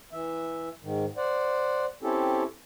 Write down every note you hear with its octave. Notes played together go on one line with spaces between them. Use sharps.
E3 E5
G#2 D#3
C5 D5 F#5
C4 C#4 E4 G4 A4